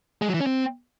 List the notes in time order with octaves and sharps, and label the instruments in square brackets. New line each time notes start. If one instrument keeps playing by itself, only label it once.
[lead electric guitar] G#3
F#3
E3
C#4
C4